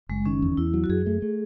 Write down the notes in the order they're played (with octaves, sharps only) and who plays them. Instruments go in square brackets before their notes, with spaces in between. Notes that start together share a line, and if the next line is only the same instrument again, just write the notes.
[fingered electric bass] F#1 [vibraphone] G#3
[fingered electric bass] D#3 [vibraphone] C#4
[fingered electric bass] E2
[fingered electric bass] E2 [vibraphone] E4
[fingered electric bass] F#3
[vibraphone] F#4
[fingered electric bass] F#2 [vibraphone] G#4
[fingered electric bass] A3
A3